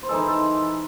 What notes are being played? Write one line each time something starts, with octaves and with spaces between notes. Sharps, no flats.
C5
E3 G#3 D#4 A4
C5
A4